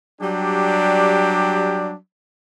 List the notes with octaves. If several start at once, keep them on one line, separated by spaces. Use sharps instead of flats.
F#3 G3 D4 G4